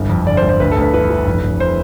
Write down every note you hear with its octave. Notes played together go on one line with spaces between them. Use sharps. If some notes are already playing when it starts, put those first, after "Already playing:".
Already playing: G1 C2
F2
D3 D5
C5
G1
C5
D2 B4
A4
D2
B4
E3 B4
E3
F1
F1
C5